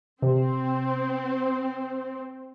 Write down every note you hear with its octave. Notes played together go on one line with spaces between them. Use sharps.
C3 C4